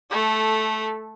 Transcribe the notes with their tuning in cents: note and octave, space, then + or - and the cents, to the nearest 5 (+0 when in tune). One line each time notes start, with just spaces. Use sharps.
A3 -10 A4 +0